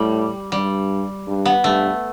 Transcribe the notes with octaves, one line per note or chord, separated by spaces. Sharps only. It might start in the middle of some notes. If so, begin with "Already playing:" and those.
Already playing: A2 G3
G2 G3
G2
B3
G2 A3